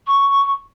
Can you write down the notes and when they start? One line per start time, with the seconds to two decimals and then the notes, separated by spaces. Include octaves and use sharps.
0.07 C#6